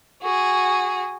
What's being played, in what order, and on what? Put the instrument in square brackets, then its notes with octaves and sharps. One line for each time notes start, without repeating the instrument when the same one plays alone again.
[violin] F#4 G#4